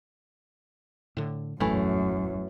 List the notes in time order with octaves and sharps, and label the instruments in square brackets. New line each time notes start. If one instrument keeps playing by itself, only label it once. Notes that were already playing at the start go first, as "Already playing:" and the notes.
[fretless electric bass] A2 D3
[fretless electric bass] E1 A#1 A2 [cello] F#2 [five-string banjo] E3 A3